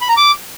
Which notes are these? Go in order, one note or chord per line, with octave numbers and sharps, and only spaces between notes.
B5
A#5
D6